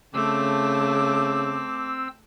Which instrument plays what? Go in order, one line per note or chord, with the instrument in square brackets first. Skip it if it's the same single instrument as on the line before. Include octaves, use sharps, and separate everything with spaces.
[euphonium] C#3 [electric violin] A3 A5 [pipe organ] C4 E6 [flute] D6